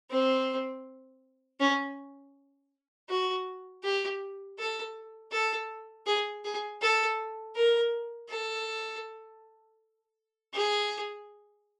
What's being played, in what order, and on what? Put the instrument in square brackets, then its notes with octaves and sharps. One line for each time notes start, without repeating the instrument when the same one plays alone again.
[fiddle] C4
C#4
F#4
G4
A4
A4
G#4
G#4
A4
A#4
A4
G#4